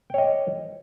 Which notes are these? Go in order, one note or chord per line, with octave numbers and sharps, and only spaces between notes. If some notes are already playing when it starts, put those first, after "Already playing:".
C#5 D#5 G5